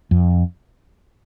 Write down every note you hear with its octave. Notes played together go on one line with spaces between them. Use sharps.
F2